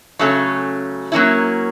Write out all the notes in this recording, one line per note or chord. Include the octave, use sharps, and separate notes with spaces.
C#3 F#3 A3 C#4
F#3 A#3 C#4 E4